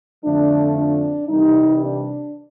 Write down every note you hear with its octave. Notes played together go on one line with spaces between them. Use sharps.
F2 D3 F3 A3 D4
D4
C2 C3 E3 G3 D#4
D4